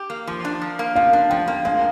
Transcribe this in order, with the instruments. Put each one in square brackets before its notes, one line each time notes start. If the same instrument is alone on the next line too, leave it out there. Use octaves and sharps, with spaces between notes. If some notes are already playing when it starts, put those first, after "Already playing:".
Already playing: [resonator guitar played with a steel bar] G4
A#3
F3
D4
F3
A#3
[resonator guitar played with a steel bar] F3 [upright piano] F5
[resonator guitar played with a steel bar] D4
[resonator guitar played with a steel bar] F3 [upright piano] G5
[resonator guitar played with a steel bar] A#3
[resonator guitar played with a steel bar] G#3 [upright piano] F5